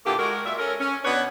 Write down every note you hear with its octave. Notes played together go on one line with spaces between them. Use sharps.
A#2 D3 A#3 B3 E4 G4
G#3 F#4 A#4
A#2 E5
C#4 A4 A#4
C#4
B2 B3 D4 B4 C#5